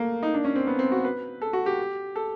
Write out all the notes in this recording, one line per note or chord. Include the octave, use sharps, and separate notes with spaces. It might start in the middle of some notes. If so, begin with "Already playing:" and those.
Already playing: A3 A#3
D#4
D4
C#4
C4
B3
C4
F#4
B4
A4
F#4
G4
A4